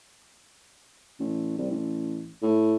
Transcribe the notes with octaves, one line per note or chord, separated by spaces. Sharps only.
A1
C2
A1
A2